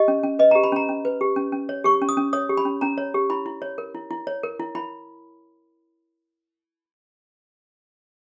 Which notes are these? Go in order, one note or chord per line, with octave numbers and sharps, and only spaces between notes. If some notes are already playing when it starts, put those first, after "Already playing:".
Already playing: G4 D#5
C#4
C#4
B4 D#5
A#5
G4
B5
C#4 A#5
C#4
B4
G4
C#4
C#4
C#5
G4 C#6
C#4
D#6
C#4
C#5 D#6
G4
B5
C#4
C#4 A#5
C#5
G4
E4 B5
E4
C#5
A#4
E4
E4
C#5
A#4
E4
E4 B5